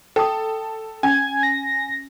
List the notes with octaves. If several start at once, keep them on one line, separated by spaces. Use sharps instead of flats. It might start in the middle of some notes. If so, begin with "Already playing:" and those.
A4 G5 D#6
C#4 G#5 G#6
A#6